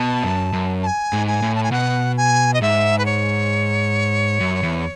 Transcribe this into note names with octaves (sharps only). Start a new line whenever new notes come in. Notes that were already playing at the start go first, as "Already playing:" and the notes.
Already playing: B2 A5
F#2
F#2
A5
G#5
G#2
G#5
A2
A5
G#5
B2 F#5
G#5
D#5
G#2 E5
B4
C#5
F#2
E2